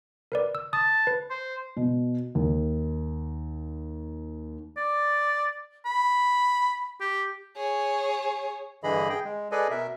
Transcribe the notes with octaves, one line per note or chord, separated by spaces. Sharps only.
A#4 B4 D5
E6
A5 D#6
B4
C5
B2
D#2
D5
B5
G4
G#4 C#5
G2 D3 E3 G#4 D#5 B5
G#4 G5
G#3
G#4 A4 B4 D5 D#5 G#5
B2 A#4 E5